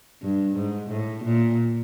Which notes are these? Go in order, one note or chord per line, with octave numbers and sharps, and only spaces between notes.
G2
G#2
A2
A#2